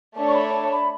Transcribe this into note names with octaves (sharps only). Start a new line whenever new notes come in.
A3 D4 A4 C#5 E5
C#6
B5
A5
B5